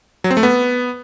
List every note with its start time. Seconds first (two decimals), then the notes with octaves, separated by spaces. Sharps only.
0.24 F#3
0.31 C4
0.37 A3
0.43 B3